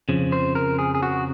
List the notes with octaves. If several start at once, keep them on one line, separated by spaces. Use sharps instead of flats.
F2 C#3 F3
C5
A#4
G#4
G#4
F#4